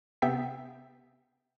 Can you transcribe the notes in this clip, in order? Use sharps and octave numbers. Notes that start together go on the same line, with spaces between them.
C3 B3 E5 G5 B6